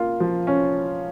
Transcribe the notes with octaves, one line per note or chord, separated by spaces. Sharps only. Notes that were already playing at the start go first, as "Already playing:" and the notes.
Already playing: A#3 F4
F3
C#4